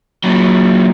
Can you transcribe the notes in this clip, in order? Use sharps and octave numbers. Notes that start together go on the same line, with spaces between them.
A#2 F#3